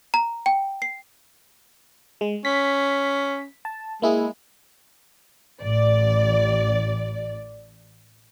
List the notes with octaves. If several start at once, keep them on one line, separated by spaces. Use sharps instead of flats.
A#5
G5
C7
G#3
C#4 B6
A5
G#3 A#3 E4 G#4
A1 D5